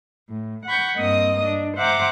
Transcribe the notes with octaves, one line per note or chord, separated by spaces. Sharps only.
A2
F#5 B5 C#6 G6
G2 A#3 C4 D#5 D#6
D4
C5 E5 F#5 G5 A#5 D6